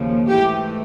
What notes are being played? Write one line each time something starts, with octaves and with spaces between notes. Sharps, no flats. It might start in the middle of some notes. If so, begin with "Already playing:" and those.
Already playing: D#2 C#3 F3
G#2 E3 A3 G4